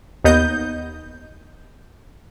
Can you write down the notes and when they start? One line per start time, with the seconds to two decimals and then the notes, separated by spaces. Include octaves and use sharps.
0.24 D#2 B3 D#4 D#5 G6